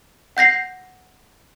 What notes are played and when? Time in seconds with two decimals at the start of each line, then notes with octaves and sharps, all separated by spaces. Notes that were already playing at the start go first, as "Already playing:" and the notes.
0.37 F#5 G6 A#6 C7